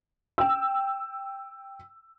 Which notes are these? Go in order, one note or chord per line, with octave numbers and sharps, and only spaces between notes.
G5 E6